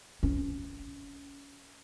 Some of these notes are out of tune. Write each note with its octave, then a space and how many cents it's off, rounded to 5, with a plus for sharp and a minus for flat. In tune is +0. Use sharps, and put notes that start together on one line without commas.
C#4 +25